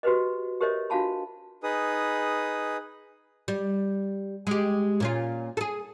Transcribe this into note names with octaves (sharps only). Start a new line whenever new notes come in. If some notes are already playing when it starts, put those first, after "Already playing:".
F#4 G4 B4 C5 D#5
G4 A#4 C5 C#5 D#5 E5
D4 F4 F#4 F5 A5 B5
D#4 G#4 B4 D#6
G3
G#3 G4
A#2 C#4 F4
G#4 A4